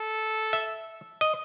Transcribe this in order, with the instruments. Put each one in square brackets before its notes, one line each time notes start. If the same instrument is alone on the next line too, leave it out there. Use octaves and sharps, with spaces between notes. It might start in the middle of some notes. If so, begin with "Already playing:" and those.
Already playing: [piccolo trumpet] A4
[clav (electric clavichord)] E5
D#5